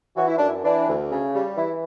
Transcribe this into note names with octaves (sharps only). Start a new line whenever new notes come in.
E3 F#4
E4
F#2 D4
E4
E3 D4
D2
C#3
G3
E3 E4